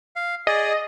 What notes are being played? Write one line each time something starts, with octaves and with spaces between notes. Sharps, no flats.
F5
G#4 D5 D#5